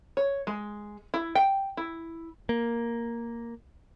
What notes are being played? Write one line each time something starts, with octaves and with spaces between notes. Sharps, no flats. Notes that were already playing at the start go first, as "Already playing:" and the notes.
C#5
G#3
E4
G5
E4
A#3